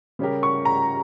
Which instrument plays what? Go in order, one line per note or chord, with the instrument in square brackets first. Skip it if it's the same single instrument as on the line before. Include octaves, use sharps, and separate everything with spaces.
[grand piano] C#3 G3 C#4 G4 A#4
[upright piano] C#6
A#5